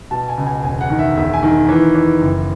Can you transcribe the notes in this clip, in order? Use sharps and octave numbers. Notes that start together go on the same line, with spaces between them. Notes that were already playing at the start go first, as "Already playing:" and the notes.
B2 A5
G#5
C#2
G#5
E1 G#5
F#5
D#3
E5
E1 E5
G#5
D#3
E3
E3
F#1